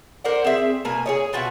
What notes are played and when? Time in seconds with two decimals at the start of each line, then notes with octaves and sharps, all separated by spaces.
0.24 A#4 C5 D5 F#5
0.44 C4 G#4 E5
0.85 B2 A#3 G#5
1.06 G#4 C#5 D#5
1.33 B2 F4 F#4 E5